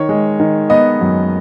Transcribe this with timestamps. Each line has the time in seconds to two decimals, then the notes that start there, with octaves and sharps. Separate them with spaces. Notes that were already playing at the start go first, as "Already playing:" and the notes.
Already playing: D#3 C#5
0.09 G#3
0.40 D#3
0.70 B3 D#5
1.01 F#2